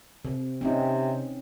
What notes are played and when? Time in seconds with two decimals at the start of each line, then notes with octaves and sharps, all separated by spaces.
0.25 C3
0.61 C3 C4 C#4 D#4